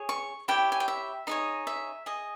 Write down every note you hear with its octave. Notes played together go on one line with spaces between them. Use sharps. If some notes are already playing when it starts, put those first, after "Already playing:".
Already playing: G#4 C#5
C#6
E4 G4 C#5 G5
G#5
G5
E5
D#4 G#4 C#5 D#5
E5
G#4 D#5